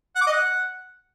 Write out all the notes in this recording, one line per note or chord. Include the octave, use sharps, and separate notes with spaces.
F#5
D6
D#5
F#5